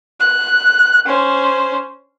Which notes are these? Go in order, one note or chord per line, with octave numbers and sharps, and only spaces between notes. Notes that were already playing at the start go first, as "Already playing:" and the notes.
F#6
C#4 C5